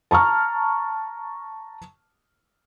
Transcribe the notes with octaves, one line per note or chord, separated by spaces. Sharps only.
A5 A#5 C#6 F6